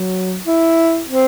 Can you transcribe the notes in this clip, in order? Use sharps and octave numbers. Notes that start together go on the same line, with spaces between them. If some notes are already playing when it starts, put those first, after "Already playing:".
Already playing: F#3
E4
C4